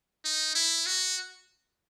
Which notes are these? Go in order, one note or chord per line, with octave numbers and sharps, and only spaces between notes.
D#4
E4
F#4